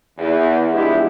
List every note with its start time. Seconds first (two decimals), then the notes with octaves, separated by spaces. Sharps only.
0.18 E2
0.73 F3 G#3 B3 D4 E4 G4